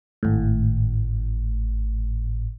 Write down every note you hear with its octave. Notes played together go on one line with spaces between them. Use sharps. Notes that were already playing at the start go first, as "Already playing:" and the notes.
G#1 A2